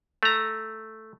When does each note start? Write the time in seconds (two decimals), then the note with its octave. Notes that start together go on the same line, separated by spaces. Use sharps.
0.23 A3 A#5